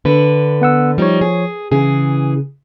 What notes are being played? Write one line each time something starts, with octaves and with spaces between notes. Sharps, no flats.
D3 B4
B3 F#5 E6
F3 G3 D#4 C#5
G#4
C#3 E3 G#4